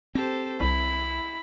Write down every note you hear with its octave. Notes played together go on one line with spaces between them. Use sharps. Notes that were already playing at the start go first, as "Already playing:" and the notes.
C4 G4 A4 C5
C2 E4 B5